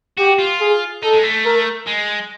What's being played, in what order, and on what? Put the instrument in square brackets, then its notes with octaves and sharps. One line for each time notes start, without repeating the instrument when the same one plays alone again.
[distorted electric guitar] F#4 [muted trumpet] G4
[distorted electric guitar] F4
[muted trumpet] G#4
[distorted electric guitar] D#4 [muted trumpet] A4
[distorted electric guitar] G#3
A3
[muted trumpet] A#4
[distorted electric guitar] G#3